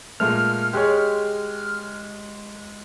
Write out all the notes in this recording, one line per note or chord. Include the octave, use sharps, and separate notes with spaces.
A#2 G#3 A3 F6
G#3 G4 G#4 C#5